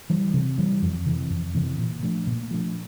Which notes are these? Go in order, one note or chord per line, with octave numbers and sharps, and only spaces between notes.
E3 G3
C3
E3 G3
F2
C3 E3
F2
C3 E3
A#2
F3 A3 D4
A#2
F3 A3 D4